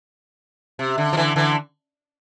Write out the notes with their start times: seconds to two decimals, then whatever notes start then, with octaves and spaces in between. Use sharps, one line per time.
0.79 C3
0.98 D3
1.13 F3
1.17 D3 E3
1.36 D3 E3